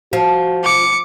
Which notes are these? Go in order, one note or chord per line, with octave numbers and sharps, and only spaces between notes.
F3 F#4
D6 C#7